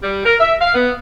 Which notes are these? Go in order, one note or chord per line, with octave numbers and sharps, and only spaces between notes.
G3
A#4
E5
F5
B3